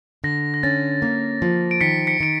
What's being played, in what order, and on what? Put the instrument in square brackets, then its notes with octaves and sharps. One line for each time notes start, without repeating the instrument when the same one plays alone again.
[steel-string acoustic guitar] D3 [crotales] A#6
[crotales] A#6
[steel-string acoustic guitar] C#4 [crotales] A6
[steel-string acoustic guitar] A#3
F3
[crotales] D7
[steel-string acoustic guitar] D#3 [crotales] B6 C#7
[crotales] B6 C#7
[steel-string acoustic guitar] D#3 [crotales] D7